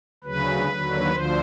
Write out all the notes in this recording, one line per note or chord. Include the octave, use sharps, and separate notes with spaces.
D2 C#3 F#3 B4
D#2 D3 F#3
D2 D3 F3 C5